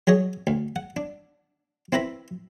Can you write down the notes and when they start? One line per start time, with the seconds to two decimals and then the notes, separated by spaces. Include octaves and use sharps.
0.07 F#3 G#4 C#5 D#5
0.47 D2
0.76 F#5
0.97 D4
1.92 C4 E4 B4 A#5 B5